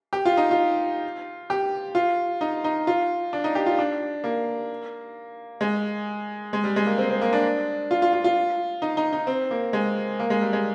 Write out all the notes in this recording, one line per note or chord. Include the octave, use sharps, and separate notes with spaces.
G4
F4
D#4
F4
G4
F4
D#4
D#4
F4
D4
D#4
G4
F4
D4
A#3
G#3
G#3
G3
G#3
A#3
C4
C4
A#3
D4
F4
F4
F4
F4
D#4
D#4
D#4
C4
A#3
G#3
A#3
G#3
G3
G#3